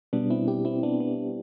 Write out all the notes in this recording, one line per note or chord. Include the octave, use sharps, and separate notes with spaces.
B2 G3 B3 D4
C4 E4
E4 G4
C4 E4
B3 D4
B3